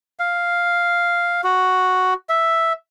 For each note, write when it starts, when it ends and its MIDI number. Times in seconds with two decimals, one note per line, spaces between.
0.19 1.41 77
1.44 2.14 66
2.29 2.73 76